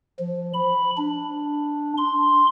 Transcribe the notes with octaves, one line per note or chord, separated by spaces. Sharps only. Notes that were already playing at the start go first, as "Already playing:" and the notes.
F3
B5
D4
C6